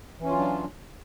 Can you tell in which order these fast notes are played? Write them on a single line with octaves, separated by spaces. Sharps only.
E3 C#4 F4 F#3 D4